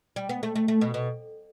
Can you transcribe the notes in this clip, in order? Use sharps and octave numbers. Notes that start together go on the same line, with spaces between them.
G3
B3
A3
A3
A3
B2
B2